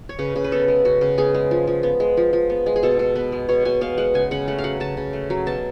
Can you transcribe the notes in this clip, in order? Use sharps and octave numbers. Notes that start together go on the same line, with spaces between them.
C#5
C#3 B4
C#3
B4
B3 A4
G#3
C#3 F#4
C#3
B3 G#4
G#3
F3
F3
B3
G#3
F3
F3
B3
G#3
G#4
B2 A4
B2
B3 B4
G#3
B2 C#5
B2 G#5
B3 F5
G#3 F#5
C#3 G#5
C#3 F#5
A3 F#5
F5
F#3 F#5
C#3 A5
C#3
A3
F#3
B2 A5